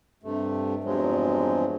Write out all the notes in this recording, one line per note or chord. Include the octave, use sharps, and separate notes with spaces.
G2 C3 A3
E2 G2 C3 F3 F#3 G#3